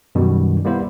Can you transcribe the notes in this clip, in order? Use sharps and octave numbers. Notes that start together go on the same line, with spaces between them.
F#2 B2 D#3 G3
G3 A#3 B3 E4 C5